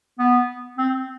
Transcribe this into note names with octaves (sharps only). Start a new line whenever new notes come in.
B3
C4